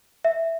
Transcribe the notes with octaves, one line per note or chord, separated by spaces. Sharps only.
E5